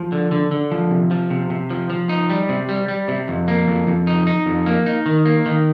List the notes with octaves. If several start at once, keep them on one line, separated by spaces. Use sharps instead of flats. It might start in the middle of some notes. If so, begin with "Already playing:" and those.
Already playing: F3
D3
D3
D3
F3
C3
F3
C3
C3
F3
F3
D#4
G3
C3
G3
G3
C3
F2
A#3
F2
F2
D#4
D#4
F2
A#3
D#4
D#3
A#3
D#3